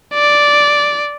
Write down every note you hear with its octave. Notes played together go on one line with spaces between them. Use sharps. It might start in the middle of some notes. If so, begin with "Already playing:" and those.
D5